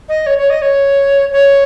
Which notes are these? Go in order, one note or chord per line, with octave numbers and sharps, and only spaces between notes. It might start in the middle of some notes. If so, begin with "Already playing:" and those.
D#5
C#5
C#5
D#5
C#5
C#5